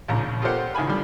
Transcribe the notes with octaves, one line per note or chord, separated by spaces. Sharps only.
A#1 D#2 C#3 A#5
F4 G4 A4 A#4 C5 F#5
C#2 D#3 E4 G#5 B5
D3 G3